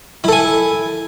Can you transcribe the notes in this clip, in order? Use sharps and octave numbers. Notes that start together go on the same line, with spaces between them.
E4 A4 G#5